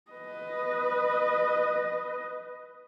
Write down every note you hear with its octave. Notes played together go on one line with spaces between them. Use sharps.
B4 D#5